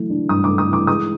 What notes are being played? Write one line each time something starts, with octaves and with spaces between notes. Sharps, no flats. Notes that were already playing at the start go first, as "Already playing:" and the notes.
Already playing: E3 F#3 A3
D4
G2 D#6
D6
A3
D#6
E3 D6
G#3 D#6